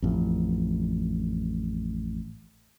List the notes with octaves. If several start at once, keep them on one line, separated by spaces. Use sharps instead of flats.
A1 F2